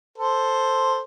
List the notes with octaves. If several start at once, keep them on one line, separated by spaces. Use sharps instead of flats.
A4 C5